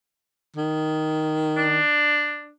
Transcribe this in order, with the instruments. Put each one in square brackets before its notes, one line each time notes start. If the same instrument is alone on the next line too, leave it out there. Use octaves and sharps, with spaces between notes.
[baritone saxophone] D#3
[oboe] D4